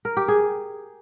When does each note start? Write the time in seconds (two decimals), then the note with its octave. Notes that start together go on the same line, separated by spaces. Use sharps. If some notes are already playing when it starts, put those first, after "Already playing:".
0.05 A#4
0.17 G4
0.28 G#4